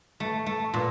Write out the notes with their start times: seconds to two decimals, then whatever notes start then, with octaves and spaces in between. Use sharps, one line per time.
0.20 A3
0.46 A3
0.74 A#2